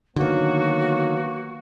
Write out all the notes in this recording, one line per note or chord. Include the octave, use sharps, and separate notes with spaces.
D3 D#3 F#3 A#3 B3 F#4